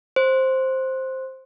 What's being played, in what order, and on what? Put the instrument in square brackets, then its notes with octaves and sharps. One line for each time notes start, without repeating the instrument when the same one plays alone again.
[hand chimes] C5